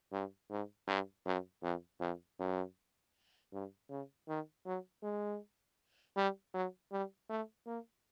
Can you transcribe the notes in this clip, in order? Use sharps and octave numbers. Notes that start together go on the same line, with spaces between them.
G2
G#2
G2
F#2
F2
F2
F#2
G2
C#3
D#3
F#3
G#3
G3
F#3
G3
A3
A#3